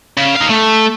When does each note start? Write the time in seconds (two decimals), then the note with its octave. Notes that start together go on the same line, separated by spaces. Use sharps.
0.18 C#3
0.36 D#4 F5
0.50 A3